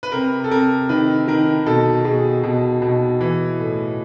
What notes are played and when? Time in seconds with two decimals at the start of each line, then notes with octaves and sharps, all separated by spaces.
0.03 B4
0.12 C3 A#4
0.44 A4
0.51 C3 A#4
0.89 D#3 B4
1.28 D#3 A#4
1.66 B2 A4
2.05 B2 G#4
2.43 B2
2.82 B2
3.20 E3
3.59 A2